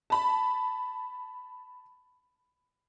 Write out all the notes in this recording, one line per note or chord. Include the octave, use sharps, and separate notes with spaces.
A5 B5